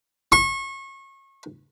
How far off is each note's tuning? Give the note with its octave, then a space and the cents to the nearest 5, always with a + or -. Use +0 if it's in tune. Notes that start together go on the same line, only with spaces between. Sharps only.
C#6 -30